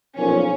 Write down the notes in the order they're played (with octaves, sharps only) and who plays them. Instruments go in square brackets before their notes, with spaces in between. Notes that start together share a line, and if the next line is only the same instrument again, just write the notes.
[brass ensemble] B1 A#2 F3 [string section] C#4